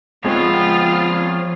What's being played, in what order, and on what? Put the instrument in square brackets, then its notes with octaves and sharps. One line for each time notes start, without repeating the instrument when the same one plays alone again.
[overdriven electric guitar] F3 C#5 [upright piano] G#3 [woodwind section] B3 C4 [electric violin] F4